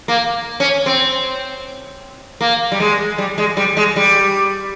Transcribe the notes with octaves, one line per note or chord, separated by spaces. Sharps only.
A#3
C#4
C4
A#3
G3
G#3
G3
G#3
G3
G#3
G3